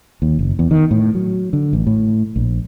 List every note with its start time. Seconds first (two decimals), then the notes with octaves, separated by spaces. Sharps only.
0.22 D#2
0.39 F#1
0.59 E2
0.71 D#3
0.91 A2
1.15 F#3
1.53 D3
1.73 A1
1.87 A2
2.36 A#1